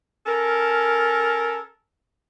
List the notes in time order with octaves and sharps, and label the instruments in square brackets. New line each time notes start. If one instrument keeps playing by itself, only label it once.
[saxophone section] C#4 A4 A#4